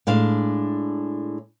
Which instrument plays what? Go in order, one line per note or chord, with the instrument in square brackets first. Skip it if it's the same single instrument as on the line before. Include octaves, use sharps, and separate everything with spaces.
[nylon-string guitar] A2 G#3 D4 F5